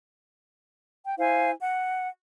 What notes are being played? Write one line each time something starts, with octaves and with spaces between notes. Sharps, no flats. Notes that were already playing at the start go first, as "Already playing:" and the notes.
G5
E4 C5 F5 G#5
F#5